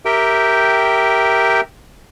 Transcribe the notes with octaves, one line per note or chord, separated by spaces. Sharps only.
G4 A#4 E5 G5